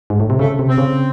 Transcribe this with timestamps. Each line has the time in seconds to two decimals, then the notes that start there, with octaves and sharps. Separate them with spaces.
0.10 G#2
0.20 A2
0.30 C3
0.39 C#3 A3
0.59 C3
0.69 C4
0.78 C#3